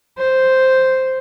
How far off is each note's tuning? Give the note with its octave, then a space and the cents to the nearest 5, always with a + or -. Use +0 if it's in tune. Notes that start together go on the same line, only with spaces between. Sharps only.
C5 -5